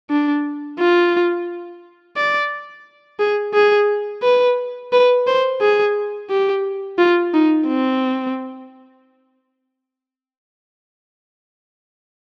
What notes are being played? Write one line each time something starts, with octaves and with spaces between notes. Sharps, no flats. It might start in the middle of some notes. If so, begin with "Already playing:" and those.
D4
F4
D5
G#4
G#4
B4
B4
C5
G#4
G4
F4
D#4
C4